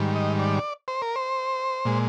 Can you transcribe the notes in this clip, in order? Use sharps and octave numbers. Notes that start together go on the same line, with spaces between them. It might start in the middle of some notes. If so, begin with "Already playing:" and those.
Already playing: G#2 D#3 G3
D#5
D5
C5
A#4
C5
A#2 G#3